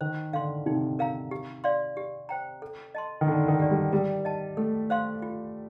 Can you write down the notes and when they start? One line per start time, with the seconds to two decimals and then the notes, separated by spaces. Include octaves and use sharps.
0.01 D#3 C5
0.33 D3 F5 C6
0.66 C3 D#4
0.99 A#4 F5 A#5
1.31 G4
1.64 D5 F5 C6
1.97 G4
2.29 C5 G5 A#5
2.62 A4
2.95 D#5 A5 C6
3.21 D#3
3.27 D3 D#4
3.48 D#3
3.59 G4 D5
3.71 G3
3.92 G3 A#4
4.25 D#5 A5
4.57 A3 A4
4.90 C5 F5 C6
5.22 F4